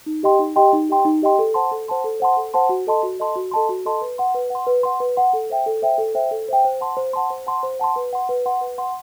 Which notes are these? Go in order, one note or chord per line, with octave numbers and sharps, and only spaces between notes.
D#4
G4 D#5 G5 C6
D#4
G4 D#5 G5 C6
D#4
G4 D#5 G5 C6
D#4
G4 D#5 G5 C6
A4
C5 F#5 A5 C6
A4
C5 F#5 A5 C6
A4
C5 F#5 A5 C6
A4
C5 F#5 A5 C6
F#4
A4 D#5 A5 C6
F#4
A4 D#5 A5 C6
F#4
A4 D#5 A5 C6
F#4
A4 D#5 A5 C6
B4
F#5 C6
B4
F#5 C6
B4
F#5 C6
B4
F#5 C6
A4
C5 E5 G5
A4
C5 E5 G5
A4
C5 E5 G5
A4
C5 E5 G5
C5
F#5 A5 C6
C5
F#5 A5 C6
C5
F#5 A5 C6
C5
F#5 A5 C6
B4
F#5 C6
B4
F#5 C6
B4
F#5 C6